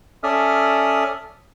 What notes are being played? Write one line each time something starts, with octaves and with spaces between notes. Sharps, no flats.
C#4 A4 D5 E5 D#6 F6